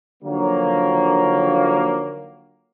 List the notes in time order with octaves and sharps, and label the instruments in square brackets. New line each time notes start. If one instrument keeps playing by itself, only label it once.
[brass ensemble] D3 D#3 F3 F#3 A#3